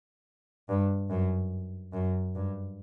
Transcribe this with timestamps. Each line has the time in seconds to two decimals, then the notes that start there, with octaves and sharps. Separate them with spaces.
0.69 G2
1.10 F#2
1.93 F#2
2.35 G2